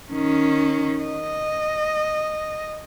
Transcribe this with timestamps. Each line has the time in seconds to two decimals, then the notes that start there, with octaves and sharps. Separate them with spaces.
0.11 D#3 C#4
1.04 D#5